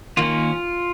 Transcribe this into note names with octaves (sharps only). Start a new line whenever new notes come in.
D#3 A#3 C#4 F4